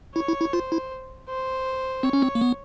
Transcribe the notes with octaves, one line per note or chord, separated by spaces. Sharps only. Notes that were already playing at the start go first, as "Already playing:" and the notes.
E4 C#5
E4
E4
F4 C5
E4
C5
C4 C#5
C#4
C4
A#3
B3